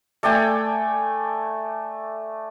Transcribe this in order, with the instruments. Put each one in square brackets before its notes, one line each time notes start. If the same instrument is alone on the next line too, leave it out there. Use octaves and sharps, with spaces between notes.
[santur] A3 D5 G5 G#5